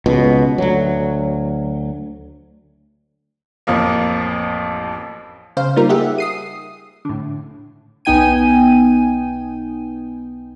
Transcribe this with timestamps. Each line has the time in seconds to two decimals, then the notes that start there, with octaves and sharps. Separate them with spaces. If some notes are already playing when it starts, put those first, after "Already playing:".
0.06 C#2 B2
0.58 D2 F#3
3.67 A1 F2 F3 A#3
5.57 C#3 C5 F5
5.76 G3 A#3 D#4 F4 A#4
5.89 G4 G#4 E5 F#5
6.18 D#6 C7 D#7
7.05 A2 D3
8.05 B1 B3 D#4 G5 G#5 D#7